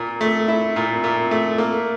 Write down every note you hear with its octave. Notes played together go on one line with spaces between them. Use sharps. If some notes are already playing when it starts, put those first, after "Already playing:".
Already playing: A#2
A3
E4
A#2
A#2
A3
A#3